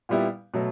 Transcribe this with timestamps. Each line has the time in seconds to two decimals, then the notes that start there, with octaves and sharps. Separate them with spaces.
0.09 A#2 G3 B3 E4 G4
0.54 B2 F#3 A3